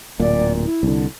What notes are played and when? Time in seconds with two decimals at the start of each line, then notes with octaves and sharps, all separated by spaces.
0.20 D1 A#2 D5
0.65 E4
0.83 C2 D3